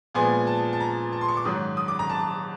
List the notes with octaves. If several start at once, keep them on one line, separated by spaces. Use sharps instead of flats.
A#2 F3 G#3 B3 G#5
A5
A5
A#5
A5
C6
C#6
D6
G#2 D#3 F#3 D#6
D#6
D6
A#5
A5